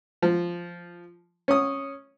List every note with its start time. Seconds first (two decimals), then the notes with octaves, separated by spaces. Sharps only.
0.22 F3
1.48 C#4 D#6